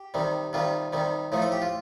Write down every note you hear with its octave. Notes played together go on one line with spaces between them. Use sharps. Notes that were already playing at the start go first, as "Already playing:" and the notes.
Already playing: G4
C3 D#3 G3
C3 D#3 G3 F4
C3 D#3 G3
A2 F3 A3 D#4
A4
G4
F4